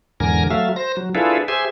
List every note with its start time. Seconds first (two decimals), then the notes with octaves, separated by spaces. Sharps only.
0.20 E2 G#2 D3 A#4 G#5 A#6
0.50 F#3 A3 E5 F5
0.76 C5 A#6
0.97 F#3
1.15 D4 E4 F4 G#4 A4 B4
1.48 G4 G#4 C5 E5 G#5